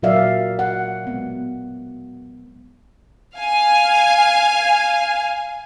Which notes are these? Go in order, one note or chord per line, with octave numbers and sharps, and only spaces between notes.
A#2 F#3 A#4 D5 E5 F5
F#5
G#3 B3
F5 G#5